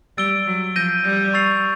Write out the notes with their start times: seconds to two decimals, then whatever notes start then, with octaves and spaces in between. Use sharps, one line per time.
0.18 G3 E6 A6 D7 G7
0.47 F#3
0.76 F3 G6 A#6 D#7 G7
1.05 G3
1.34 C#6 E6 A6 C7 F7